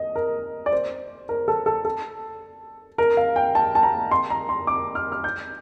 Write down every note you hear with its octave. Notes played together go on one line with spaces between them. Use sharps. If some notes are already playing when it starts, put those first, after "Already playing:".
Already playing: D#5
A#4
D5
C5
A#4
A4
A4
A4
A#4
F5
G5
A5
A5
A#5
C6
A#5
C6
D6
F6
F6
G6